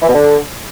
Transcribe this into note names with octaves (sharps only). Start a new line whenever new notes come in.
E3
B2
D3